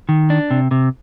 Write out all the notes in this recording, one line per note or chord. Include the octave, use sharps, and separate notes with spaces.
D#3
D4
C3
C3